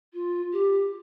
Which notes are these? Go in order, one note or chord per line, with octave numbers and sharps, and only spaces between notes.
F4
G4